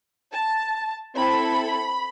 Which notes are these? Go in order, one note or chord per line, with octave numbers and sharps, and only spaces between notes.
A5
C4 E4 A4 B5